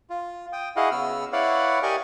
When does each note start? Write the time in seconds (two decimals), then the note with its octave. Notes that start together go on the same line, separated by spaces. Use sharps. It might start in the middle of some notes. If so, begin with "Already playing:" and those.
0.10 F4
0.53 G5 D#6
0.76 E4 F#4 G#4 D#5 F5 F#5
0.92 C#3 B3 E6 F6
1.32 E4 B4 C#5 D5 F5 F#5
1.83 G4 A#4 D5 D#5 G#5 C#6